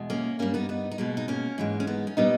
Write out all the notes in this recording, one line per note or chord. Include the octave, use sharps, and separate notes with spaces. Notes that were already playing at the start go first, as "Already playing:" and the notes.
Already playing: E2 B2 G#3
A#3 C#4
G2 G3 A#3 C#4
B3 D#4
B3 D#4
D#4
B2 G#3 A#3 C#4
D#4
A#3 C#4
G#2 E3 G#3
C#4
B3 D#4
C#4
A#2 G3 B3 D#4